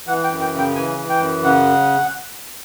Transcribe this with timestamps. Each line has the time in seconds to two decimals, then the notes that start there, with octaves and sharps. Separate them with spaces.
0.07 E3 F#5
0.24 G5
0.30 F#2
0.41 G5
0.52 C#3
0.58 G5
0.75 E3 G#5
0.98 E3
1.09 G5
1.21 F#2
1.44 C#3 F#5